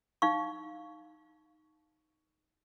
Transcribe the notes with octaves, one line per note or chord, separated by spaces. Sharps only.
D#4 F5 C#6